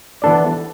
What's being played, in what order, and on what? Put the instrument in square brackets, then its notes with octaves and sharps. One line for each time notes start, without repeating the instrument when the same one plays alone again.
[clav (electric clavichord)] E3 B3 D4 A4 D5